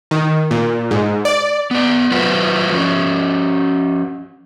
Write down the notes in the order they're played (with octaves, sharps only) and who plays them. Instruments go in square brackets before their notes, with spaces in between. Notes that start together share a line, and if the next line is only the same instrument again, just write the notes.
[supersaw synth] D#3
A#2
G#2
D5
[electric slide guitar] B3 D5
F#3 F4 F#4 B4 C5
F3 C#4